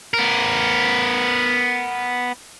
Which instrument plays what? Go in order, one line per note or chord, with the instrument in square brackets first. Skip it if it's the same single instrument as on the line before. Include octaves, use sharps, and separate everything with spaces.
[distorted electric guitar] B3 A#4